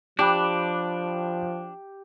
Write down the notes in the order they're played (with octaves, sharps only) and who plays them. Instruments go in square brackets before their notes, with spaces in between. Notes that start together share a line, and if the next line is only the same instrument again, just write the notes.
[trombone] F3 [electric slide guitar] D4 [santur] G4 [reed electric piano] B5 D6 F#6